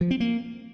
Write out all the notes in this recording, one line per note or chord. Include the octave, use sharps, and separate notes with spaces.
F3
C4
A#3